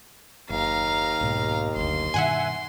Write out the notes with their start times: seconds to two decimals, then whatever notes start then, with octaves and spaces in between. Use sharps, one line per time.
0.50 F#1 D#2 F5 A#5
1.21 B1 G#2 B2
1.76 F#1 D2 C6
2.14 G2 B2 D#3 E5 F#5 G#5